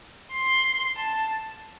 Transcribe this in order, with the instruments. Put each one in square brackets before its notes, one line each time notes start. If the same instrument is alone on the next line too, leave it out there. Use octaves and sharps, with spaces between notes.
[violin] C6
A5